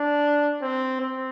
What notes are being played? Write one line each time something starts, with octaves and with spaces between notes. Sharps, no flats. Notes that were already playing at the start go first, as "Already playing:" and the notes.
Already playing: D4
C4
C4